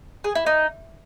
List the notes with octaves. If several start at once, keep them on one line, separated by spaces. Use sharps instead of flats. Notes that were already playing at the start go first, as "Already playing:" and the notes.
G#4
E4
D#4